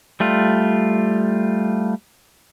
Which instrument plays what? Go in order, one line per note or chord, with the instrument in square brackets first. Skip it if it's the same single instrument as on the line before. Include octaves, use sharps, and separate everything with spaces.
[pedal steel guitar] G3 A3 F4